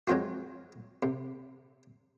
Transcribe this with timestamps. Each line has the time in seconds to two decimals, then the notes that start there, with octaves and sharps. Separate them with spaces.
0.08 F#3 G#3 C4 F4 F#4
1.03 C3